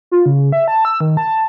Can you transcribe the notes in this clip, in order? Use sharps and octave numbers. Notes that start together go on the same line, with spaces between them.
F4
C#3
E5
A5
E6
D#3
A5